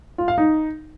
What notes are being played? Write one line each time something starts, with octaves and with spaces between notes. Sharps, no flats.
F4
F5
D#4